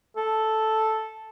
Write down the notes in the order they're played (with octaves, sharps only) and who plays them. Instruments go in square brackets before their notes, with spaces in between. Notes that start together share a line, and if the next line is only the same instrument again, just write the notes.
[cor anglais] A4